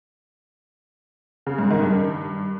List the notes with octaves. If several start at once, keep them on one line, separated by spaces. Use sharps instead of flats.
C#3
G#2
D#3
G2